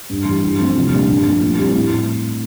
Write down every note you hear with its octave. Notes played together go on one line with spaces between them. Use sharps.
G2
E3 G3
G2
F3 A3 C4
C2
A#2 G3 D4
G2
F3 A3
A#2
G3 C4 E4
A2